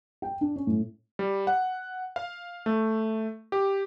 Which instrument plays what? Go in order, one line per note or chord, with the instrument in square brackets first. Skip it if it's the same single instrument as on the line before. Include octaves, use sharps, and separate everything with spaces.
[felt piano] G5
D4
C#4
A2
[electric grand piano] G3
F#5
F5
A3
G4